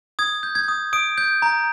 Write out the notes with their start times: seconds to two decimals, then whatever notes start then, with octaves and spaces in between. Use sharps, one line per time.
0.19 D#6 G#6
0.43 G6
0.55 G#6
0.68 D#6
0.93 D#6 D7
1.18 G6
1.42 A#5